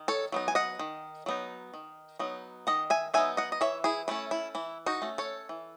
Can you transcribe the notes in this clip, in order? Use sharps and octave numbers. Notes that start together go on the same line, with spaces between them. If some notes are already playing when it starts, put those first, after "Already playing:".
Already playing: D#3
A4 C#5
F#3 B3 D#4
G#5
D#5 F#5
D#3
F#3 B3 D#4
D#3
F#3 B3 D#4
D#3 D#5 F#5
E5 G#5
F#3 B3 D#4 E5 G#5
D#5 F#5
D#5
E3 C#5 E5
E4 G#4
A3 C#4 E4
E4
E3 E4
D#4 F#4
A3 C#4
A4 C#5
E3